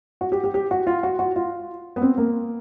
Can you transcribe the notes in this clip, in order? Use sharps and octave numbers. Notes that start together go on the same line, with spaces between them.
F#4
G4
G4
G4
F#4
F4
F#4
F#4
F4
B3
C4
A#3